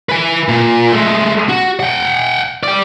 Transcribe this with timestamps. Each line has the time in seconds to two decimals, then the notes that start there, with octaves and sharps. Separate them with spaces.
0.09 B4 G#5
0.49 A#2
0.92 G#3 A3
1.49 F#4
1.80 F#5 G5
2.63 D5 G5